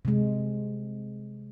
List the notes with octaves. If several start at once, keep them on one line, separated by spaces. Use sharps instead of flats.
C3 G#3